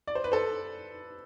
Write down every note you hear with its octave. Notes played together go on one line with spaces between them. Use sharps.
D5
C5
B4
A4 C5